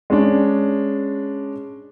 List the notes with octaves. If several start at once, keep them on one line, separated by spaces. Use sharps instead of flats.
G#3 C#4 D4